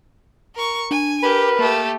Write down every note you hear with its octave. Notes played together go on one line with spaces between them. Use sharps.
A#4 C#6
D4 G#5
G4 A#4 B4
A3 A#3 G4